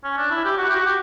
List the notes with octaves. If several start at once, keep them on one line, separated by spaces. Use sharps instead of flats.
C#4
D4
E4
G4
F#4
G4
F#4
G4